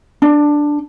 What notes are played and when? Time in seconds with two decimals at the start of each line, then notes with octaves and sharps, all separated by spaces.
0.22 D4